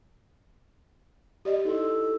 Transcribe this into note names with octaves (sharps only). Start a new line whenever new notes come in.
G4 D5 D#5
D#4 E4 A4